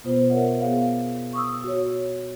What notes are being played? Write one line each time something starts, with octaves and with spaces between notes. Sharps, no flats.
B2 B3 F4 C5
A#4 C#5 E5 F#5
B3 G#4 F5
C#6 D#6 E6
F#4 C#5